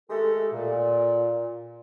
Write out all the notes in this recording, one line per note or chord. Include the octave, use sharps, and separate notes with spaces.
D#3 G#3 A3 G4 A4
A#2